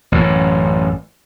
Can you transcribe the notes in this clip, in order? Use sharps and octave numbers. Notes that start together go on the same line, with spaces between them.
A1 F#2 A2